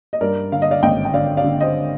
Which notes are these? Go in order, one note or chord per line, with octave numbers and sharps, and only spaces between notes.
D#5
G2 A#4 D5
D3 F5
D#5
D5 F5
G#1 D#5 G5
G5
D3 D5 F5
D5 F5
D3
C5 D#5